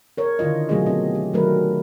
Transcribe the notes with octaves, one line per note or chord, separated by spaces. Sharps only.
A#4 C#5
D3 D#3 E4 F4 D#5
B2 F#3 A3 F4 G#4 D#5
B2 C4 D#5
G4
D#3 F#3 A3 A#4 B4